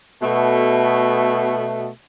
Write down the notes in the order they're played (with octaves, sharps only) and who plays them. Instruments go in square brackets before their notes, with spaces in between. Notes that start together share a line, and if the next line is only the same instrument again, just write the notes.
[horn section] B2 A3